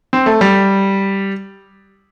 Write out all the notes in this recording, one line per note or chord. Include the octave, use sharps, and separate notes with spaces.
C4
A3
G3